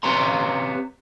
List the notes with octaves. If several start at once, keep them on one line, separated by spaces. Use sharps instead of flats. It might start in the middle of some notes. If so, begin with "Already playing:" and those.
C4 G4 B4 C#5 A#5 C6